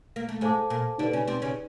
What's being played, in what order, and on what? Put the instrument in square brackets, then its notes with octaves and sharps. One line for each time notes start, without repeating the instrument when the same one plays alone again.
[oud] A#3
A3
[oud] G#2 G#3 [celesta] A4 C5 F5 A5 D6
[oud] A#2 A#3
[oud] D3 D4 [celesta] D#4 G4 B4 D5
[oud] C#3 C#4
C3 C4
C#3 C#4